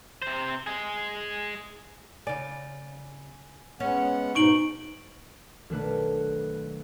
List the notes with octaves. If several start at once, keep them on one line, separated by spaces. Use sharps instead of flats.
C3 C5
G#3 G#4
C#3 D5 G#5
G#3 B3 C#4 F#5
G#2 B2 D#4 C#6 D7 F#7
B1 D#3 A3 D4 B4 F#6